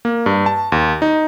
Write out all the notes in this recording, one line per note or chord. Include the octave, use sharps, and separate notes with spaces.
A#3
G2
A5
D#2
D#4